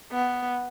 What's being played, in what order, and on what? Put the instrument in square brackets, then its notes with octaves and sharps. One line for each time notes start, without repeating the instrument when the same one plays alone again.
[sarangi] B3